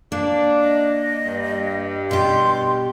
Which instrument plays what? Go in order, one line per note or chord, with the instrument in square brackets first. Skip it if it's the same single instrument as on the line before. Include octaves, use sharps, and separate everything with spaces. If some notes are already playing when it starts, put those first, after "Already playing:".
[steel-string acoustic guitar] A#3 [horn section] D4
[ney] D#5
[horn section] G2
[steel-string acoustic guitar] B2 G4 [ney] C6